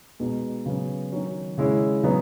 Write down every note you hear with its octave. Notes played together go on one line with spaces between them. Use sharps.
B2 G#3 D#4 F#4
C#3 F#3 B3
D#3 F#3 C#4
C#3 G#3 C#4 E4
C#3 F#3 B3 D#4